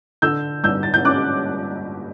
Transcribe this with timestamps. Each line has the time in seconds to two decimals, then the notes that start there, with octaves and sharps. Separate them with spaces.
0.22 D3 E6 G6
0.64 G2 E6 G6
0.83 A6
0.94 G6
1.05 C#4 D6 F#6